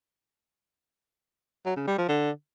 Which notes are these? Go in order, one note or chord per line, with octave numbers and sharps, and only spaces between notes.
F#3
C#3
G3
F3
D3